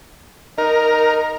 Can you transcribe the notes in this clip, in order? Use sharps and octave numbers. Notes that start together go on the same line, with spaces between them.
D#4 A#4